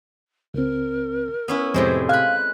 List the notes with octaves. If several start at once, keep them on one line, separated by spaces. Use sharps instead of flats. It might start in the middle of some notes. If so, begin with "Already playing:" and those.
C#2 C4 A#4
B3 C#4 E4
F2 A2 C3 G#3 C5
F5 G#5 B5 F#6